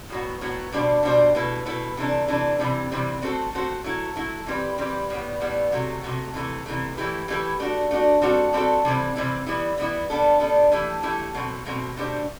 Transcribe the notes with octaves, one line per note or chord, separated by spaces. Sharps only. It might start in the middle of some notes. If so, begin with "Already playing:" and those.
A2 F#3 B3
A2 F#3 B3
B2 G3 D4 G4 C5
B2 G3 D4 G4 C5
B2 A3 E4 B4
B2 A3 E4 B4
C3 E3 A3 D4
C3 E3 A3 D4
C3 E3 G3 C4
C3 E3 G3 C4
A3 C4 F#4 A4 C5
A3 C4 F#4 A4 C5
F#3 A3 E4
F#3 A3 E4
E3 G3 C4 G4 B4
E3 G3 C4 G4 B4
A2 G3 B3
A2 G3 B3
C3 F#3 A3
C3 F#3 A3
C3 E3 A3
C3 E3 A3
E3 A3 E4 G4 B4
E3 A3 E4 G4 B4
A3 D4 F#4
A3 D4 F#4
G3 C4 F#4 A4
G3 C4 F#4 A4
C3 E3 G3 C4 E4
C3 E3 G3 C4 E4
E3 G3 B3 E4
E3 G3 B3 E4
G3 B3 D4 A4
G3 B3 D4 A4
E3 A3 E4 G4
E3 A3 E4 G4
B2 F#3 A3 C4
B2 F#3 A3 C4
B2 A3 D4 G4 C5